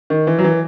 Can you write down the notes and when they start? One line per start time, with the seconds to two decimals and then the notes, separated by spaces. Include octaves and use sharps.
0.10 D#3
0.27 E3
0.39 F#3
0.44 E3